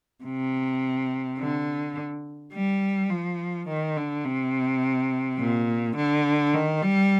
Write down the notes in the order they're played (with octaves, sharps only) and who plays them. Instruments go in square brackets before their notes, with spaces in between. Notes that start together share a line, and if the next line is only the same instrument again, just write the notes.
[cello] C3
D3
G3
F3
D#3
D3
C3
A#2
D3
D#3
G3